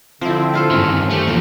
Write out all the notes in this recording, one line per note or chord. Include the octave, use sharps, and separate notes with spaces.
D3 F3 C4 E4
E4 F4 A4
G2 D#3 C#4
A3 G4
E2 F3 A#3